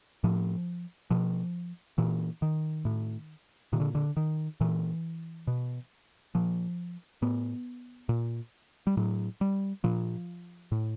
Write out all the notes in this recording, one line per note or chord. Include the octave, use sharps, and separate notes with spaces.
A2 F3
B2 F3
A#2 E3
D#3
A2
A#2 D#3
D3
D3
D#3
A#2 E3
B2
A#2 F3
A2 B3
A#2
G3
A2 F#3
G3
A#2 F3
A2